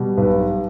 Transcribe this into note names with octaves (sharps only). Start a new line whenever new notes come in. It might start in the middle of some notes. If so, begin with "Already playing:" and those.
Already playing: B2 G3
B1 B4